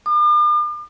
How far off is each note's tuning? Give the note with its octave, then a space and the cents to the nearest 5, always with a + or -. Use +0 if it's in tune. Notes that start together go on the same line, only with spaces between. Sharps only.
D6 +45